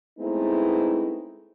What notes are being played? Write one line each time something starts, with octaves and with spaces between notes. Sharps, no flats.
G#3 A3 B3 C4 D#4 E4